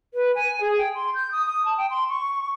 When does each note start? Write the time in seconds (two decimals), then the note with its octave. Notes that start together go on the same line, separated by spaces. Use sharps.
0.14 B4
0.35 G#5
0.61 G#4
0.78 G5
0.95 C6
1.14 G6
1.32 D#6
1.46 D#6
1.65 A5
1.78 G5
1.90 C6
2.09 C#6